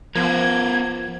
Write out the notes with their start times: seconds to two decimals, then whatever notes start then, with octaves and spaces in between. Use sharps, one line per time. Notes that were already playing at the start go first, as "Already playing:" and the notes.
0.15 F3 B3 A#4 G#6